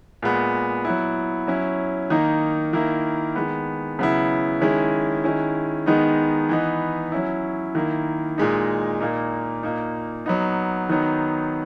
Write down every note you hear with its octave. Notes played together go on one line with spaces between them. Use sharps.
A#2 G#3 B3
F#3 B3 E4
F#3 C#4 E4
D#3 A#3 D#4
D#3 A#3 E4
D#3 G#3 B3
C#3 F#3 B3 E4
D#3 G#3 C#4 E4
D#3 G#3 C#4 E4
D#3 G#3 B3 D#4
E3 B3 D#4
F#3 C#4 E4
D#3 A#3 E4
A#2 G#3 D#4
A#2 A#3 D#4
A#2 A#3 D#4
F#3 B3 D#4
D#3 F#3 B3 D#4